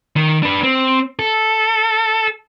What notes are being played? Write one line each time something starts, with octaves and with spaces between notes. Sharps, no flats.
D#3
D4 B4
C4
A4